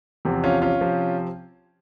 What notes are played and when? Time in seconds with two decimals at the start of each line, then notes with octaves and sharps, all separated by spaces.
0.25 E2 C3 F3 C4
0.44 C#4 F4
0.62 C#4 F4
0.81 C3 F3 C4